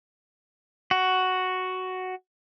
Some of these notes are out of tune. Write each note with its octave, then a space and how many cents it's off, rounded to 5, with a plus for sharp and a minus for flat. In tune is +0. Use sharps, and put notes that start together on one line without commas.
F#4 +5